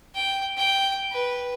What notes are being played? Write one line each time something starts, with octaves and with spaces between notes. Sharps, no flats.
G5
G5
B4